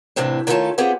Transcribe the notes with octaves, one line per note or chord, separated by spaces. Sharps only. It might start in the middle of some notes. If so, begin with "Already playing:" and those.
D#2 A2 C3 E3 C4 D4
D3 D#3 A3 C#4 F4 A5
B3 C4 F4 G4 G#4